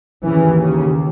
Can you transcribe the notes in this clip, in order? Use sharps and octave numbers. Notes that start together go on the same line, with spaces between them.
D#2 C#3 E3
C#3